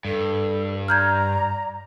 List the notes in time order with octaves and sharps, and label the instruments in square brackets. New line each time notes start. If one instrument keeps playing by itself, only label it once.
[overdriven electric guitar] G2 [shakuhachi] A4
[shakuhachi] D5 [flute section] A#5 [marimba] F6 G6 G#6